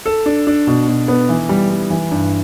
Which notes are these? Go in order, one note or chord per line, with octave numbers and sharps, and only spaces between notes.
A4
D4
D4
B2
B2
B3
E3
G3
G3
E3
G2